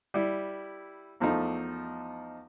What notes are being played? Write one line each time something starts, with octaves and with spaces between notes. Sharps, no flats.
G3 E4
E2 F3 A3 D#4